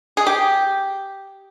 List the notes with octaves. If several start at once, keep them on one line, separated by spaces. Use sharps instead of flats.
G#4
G4